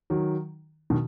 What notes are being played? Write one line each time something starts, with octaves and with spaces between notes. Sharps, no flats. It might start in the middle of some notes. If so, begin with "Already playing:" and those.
D#3 F#3
B2 D#3